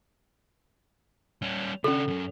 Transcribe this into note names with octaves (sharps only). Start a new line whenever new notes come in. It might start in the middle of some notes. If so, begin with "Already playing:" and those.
G3 C#4
C#3 C#4 D4 A4
C#2 F#2